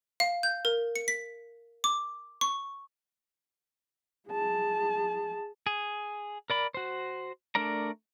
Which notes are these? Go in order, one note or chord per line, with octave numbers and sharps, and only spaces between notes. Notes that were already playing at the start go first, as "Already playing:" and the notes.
F5
G6
A#4
C#7
B6
D6
C#6
G#4 A5
G#4
A#4 D5 B5
F#4 C5
A3 D4 A#4 D5 A#5